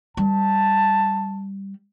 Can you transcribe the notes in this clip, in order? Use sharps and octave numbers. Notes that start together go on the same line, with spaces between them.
G3 A5